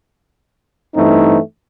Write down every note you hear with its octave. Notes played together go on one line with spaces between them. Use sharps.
G2 E3 A3 C4 D#4